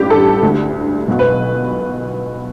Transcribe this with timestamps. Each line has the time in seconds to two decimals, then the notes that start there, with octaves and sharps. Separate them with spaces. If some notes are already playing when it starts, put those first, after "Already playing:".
Already playing: A1 G2 D3 G4
0.10 A4
0.43 D2 D3
1.08 B1 B2
1.19 B4